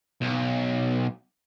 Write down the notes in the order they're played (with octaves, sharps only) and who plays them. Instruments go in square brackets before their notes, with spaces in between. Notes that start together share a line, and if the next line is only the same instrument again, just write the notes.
[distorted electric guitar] B1